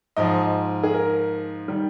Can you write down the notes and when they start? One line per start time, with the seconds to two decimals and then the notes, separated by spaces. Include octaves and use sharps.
0.17 G#2 F3 D#5
0.83 G#4
0.93 A#4
1.68 D#3 G3